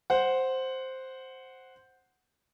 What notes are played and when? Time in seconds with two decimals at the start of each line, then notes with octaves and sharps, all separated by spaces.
0.10 C5 F#5